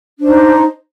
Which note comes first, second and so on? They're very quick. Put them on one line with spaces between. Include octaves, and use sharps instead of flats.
D4 C5 D#4